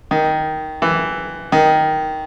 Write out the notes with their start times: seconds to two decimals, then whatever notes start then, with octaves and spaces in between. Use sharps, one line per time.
0.11 D#3
0.82 E3
1.52 D#3